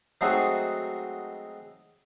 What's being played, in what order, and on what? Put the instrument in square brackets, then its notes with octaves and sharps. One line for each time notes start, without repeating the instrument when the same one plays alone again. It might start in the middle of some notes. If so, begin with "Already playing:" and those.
[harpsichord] F#3 G#3 A3 C4 D#4 F#4